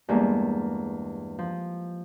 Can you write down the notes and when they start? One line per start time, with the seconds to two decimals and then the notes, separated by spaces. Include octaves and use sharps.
0.08 E2 G2 G#3 A#3
1.39 F3